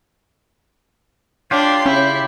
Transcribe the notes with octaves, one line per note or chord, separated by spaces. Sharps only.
D4 F4 G4 C#5 C6
C#3 E4